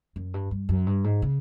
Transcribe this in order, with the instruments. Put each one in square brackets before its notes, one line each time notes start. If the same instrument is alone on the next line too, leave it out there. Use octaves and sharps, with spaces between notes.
[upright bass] F#2
G2
G2
F#2
G2
G#2
C#3